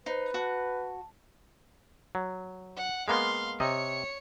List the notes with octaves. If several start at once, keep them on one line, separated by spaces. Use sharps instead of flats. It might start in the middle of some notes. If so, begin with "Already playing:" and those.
D#4 B4 C5
F#4 A5
F#3
F#5
G#3 A#3 B3 F5 C6
C3 C#5 D#5 C#7